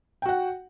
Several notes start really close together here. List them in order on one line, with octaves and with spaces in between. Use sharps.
G5 F#4 F#5